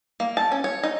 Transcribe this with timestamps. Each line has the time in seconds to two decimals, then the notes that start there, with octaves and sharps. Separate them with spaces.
0.20 A#3
0.37 A5
0.52 C#4
0.64 C#5
0.83 D#4